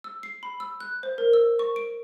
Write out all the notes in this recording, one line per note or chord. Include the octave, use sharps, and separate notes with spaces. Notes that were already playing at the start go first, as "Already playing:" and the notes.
E6
C7
B5
E6
F#6
C5
A#4
E6
C#6
D7